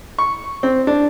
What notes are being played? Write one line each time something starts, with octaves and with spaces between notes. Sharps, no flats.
C#6
C4
D4